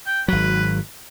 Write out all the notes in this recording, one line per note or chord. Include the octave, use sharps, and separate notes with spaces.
G5
G#1 F#3 B4